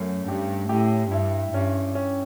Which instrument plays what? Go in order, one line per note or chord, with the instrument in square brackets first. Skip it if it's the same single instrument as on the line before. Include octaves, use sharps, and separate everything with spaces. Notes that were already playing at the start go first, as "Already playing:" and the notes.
Already playing: [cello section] F#2 [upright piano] A3 C#4
[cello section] G2 [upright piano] G4
[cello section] A2 [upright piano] G4
[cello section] G2 [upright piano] E4
[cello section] G2 [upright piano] C#4
[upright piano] C#4